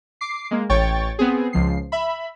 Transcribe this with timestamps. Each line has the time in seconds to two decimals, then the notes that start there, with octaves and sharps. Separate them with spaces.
0.21 D6 C7
0.51 G#3 A#3
0.70 A1 C#5 G5 C#6 A6
1.19 B3 C4 G#4
1.53 C#2 F3 C7
1.92 E5 B5